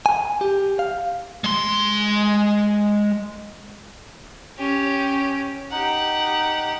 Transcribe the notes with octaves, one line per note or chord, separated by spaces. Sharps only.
G#5
G4
F5
G#3 C6
C#4 G4
D#4 G4 F#5